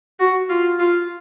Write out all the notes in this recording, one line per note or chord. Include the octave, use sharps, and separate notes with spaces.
F#4
F4
F4